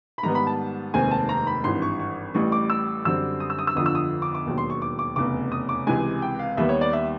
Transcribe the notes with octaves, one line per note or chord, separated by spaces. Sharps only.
B5
G#2 D#3 G3 B3 A#5
B5
A5
F1 D#2 D#3 G#3 C4 G#5
A5
A#5
B5
G#1 G2 E3 C6
C#6
C#6
A1 A2 E3 G3 C#6
D6
E6
F#2 D3 G3 C4 E6
D#6
E6
D#6
E6
G1 F2 D3 F3 D#6
E6
D#6
D6
D6
E1 D#2 D#3 F#3
C6
C#6
D6
D6
F1 E2 C#3 D6
D#6
D6
C#2 C3 E3 G#3 G#5
G5
F5
D#2 D#3 G3 B3 E5
C#5
D5
E5